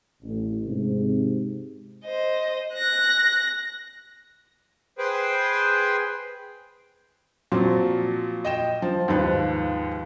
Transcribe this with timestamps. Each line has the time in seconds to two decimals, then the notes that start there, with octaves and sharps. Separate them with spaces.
0.22 A1
0.65 G#2 C3
2.05 C5 D#5
2.73 F#6 A#6
4.98 G#4 B4 C5 G5
7.52 A#2 F3 F#3 C4
8.45 D#5 G5 E7
8.82 F3
9.08 D#2 G#2 F3 B4